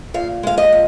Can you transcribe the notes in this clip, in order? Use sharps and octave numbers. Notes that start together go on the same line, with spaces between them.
A#2 F5
G#3 F5
D#5
A#2